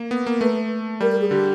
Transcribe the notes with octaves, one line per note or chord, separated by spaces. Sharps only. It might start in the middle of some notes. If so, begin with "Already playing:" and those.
Already playing: A#3
B3
A#3
A3 B4
G3 A#4
A#4
G#4
D3 G4